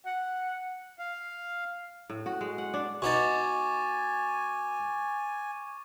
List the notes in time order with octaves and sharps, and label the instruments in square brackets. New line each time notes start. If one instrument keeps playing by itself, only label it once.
[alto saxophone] F#5
[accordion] F5
[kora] A2
F#4
G#3
F#5
D4
[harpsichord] B2 B3 D#4 [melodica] G#5 [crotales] C#6 D6 A6